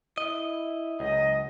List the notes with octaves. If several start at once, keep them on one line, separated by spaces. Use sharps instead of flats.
E4 D#5
C#2 F#3 D#5